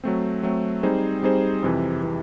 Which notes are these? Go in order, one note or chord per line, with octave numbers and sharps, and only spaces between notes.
F#3 A3 C4
F#3 A3 C4
G3 C4 D#4 G#4 C5
G3 C4 D#4 G#4 C5
F2 C3 E3
C3 E3